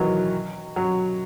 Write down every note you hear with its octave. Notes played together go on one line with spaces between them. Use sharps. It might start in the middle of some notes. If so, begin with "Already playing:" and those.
Already playing: D#3 E3 F#3
F#3